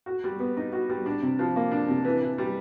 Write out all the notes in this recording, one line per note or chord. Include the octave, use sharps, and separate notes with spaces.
F#4
G3
B3
D#4
F#4
G3
D4
C3
F3
A#3
D4
C3
E3
E3
G3